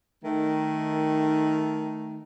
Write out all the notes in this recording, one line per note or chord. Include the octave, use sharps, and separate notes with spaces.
D#3 A3